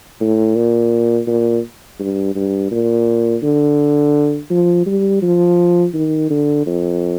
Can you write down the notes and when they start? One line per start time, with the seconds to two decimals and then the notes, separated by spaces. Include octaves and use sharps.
0.21 A2
0.56 A#2
1.27 A#2
1.99 G2
2.36 G2
2.71 A#2
3.43 D3
4.50 F3
4.86 G3
5.22 F3
5.94 D#3
6.31 D3
6.66 F2